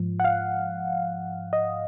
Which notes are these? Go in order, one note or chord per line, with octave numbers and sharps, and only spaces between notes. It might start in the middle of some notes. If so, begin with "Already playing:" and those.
Already playing: G#2 F3
F#5
F5
D#5